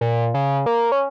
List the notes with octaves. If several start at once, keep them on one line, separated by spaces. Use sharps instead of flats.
A#2
C#3
A#3
C#4